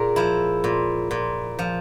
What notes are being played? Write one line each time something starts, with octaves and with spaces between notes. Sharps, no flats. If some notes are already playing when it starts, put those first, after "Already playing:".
Already playing: A#2 G#4 A#4
F3 E4
A#2
A#2
F3